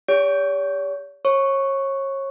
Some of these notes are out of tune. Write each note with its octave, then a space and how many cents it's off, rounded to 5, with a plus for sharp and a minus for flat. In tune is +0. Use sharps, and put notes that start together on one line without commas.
G4 +35 C#5 +45
C#5 -30 C#6 +0